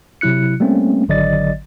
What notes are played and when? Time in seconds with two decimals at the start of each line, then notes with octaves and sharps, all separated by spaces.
0.21 C3 F#3 E4 F#6 C#7
0.60 G3 A3 A#3 C4 C#4
1.09 G#1 D3 F#3 D5 D#5 A6